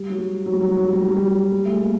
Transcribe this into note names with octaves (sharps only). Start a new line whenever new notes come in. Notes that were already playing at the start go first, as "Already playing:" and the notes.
Already playing: G3
F#3
G3
F#3
G3
F#3
G3
F#3
G3
F#3
G3
F#3
G3
F#3
G3
A3
G#3
A#3